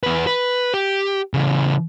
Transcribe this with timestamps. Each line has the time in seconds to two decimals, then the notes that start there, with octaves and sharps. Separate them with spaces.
0.03 E2 B4
0.27 B4
0.74 G4
1.34 C#3 E3